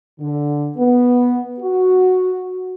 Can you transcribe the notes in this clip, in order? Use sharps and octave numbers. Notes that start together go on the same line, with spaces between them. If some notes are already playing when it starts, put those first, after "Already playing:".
D3
B3
F#4